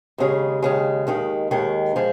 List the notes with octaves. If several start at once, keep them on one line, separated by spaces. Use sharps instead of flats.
D#2 C#3 G#3
D#2 C#3 G#3
D#2 D#3 G#3
D#2 D#3 G#3
F3 G#3